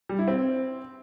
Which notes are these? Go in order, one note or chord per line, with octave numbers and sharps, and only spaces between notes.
G3
E4
C4